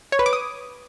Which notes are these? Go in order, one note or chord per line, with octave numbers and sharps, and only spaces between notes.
C#5
B4
D6
D#6